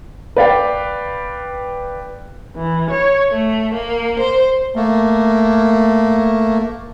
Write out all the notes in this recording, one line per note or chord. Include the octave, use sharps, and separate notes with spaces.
B4 D5 F5 G5
E3
C#5
A3
A#3
C5
A3 A#3